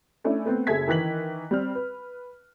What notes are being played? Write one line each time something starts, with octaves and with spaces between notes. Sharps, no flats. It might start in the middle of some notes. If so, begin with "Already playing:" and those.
A3 C#4 D4 E4
A3 B3 C4
F#1 G#4 A4 E5 G#6 B6
D#3 E3 F#6 B6 F#7
G3 C4 F6
B4